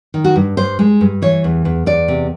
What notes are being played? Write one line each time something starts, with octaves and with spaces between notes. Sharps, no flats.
D#3
F#4
G2
G2 C5
G#3
G2
E3 C#5
E2
E2
E2 D5
C3